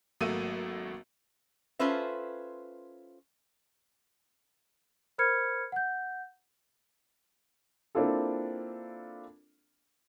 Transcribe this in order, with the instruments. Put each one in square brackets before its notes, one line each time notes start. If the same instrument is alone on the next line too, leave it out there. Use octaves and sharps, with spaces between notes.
[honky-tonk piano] G#1 F#3 A3 A#3 E6 D#7
[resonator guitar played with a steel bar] C#4 F4 A4 B4 C5 E5
[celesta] A#4 C5 B5 F6 G#6 C#7
F#5 G6
[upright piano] A#3 C4 D4 E4 F4 A4